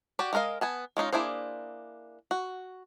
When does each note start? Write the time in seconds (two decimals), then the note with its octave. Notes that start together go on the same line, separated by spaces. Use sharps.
0.19 F#4 G4 D5
0.33 G#3 F#4 A#4 D#5 F5
0.61 B3 G#5 A5
0.97 G#3 C#4 D#4 F4
1.13 A#3 D4 E4 G#4 C5
2.31 F#4